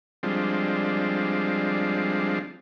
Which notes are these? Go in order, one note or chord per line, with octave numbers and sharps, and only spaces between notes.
F3 G3 G#3 C4 D4 F4